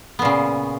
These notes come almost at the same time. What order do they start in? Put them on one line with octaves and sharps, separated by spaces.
B3 A#2 C#3